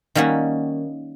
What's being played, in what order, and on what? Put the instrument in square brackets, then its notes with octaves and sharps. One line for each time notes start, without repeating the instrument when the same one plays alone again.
[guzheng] D#3 G3 A#3 C#4 F#4